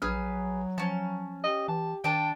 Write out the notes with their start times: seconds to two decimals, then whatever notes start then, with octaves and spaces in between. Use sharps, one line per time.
0.02 A#1 F#3 G#4 B4 F6
0.78 F3 C#4 A5
1.44 G4 D#5
1.68 E3 A5
2.04 D#3 D4 G5 A5